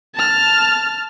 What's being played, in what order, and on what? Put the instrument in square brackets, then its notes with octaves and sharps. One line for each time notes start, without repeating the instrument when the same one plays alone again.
[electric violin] A5 F6